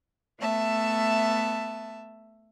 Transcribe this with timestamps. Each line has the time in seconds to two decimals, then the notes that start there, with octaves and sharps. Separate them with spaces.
0.40 A3 B3 E5 A5